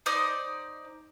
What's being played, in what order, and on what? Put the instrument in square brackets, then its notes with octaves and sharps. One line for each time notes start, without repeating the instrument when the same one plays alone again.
[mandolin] D#4 C5 D5 D#6